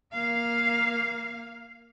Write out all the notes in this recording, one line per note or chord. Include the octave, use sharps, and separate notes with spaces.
A#3 F5